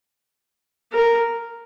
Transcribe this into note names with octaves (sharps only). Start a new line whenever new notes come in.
A#4